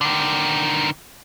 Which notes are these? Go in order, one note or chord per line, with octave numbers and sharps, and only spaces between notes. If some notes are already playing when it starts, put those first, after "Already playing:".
D3 D#3